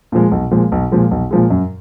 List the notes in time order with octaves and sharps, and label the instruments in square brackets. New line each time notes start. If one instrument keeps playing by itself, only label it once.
[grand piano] A#2 F3 G#3
B1
A#2 F3 G#3
B1
A#2 F3 G#3
B1
A#2 F3 G#3
F#2